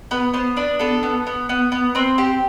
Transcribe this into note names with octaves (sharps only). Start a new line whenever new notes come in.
B3 B4
B3 C5
D4 B4
B3 A4
B3
B3
B3
B3
C4 B4
G4 C5